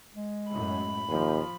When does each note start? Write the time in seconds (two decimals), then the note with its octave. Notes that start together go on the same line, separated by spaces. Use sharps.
0.14 G#3
0.49 F#2 A2 B5
1.08 D#2 F3